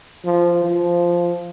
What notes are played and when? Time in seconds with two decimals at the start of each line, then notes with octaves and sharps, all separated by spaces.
0.25 F3
0.64 F3